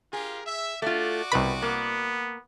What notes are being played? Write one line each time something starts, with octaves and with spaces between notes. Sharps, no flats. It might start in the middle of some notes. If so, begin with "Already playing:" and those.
F4 G4 G#4 A#4
E5
A3 F4 F#4 D5 D6
C2 B2 B4 B5
A#3 B3